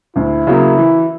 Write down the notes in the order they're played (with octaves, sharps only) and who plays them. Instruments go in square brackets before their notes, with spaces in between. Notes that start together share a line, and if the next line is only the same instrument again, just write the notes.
[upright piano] D2 [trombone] E4
[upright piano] C#3 F#3 A#3
E3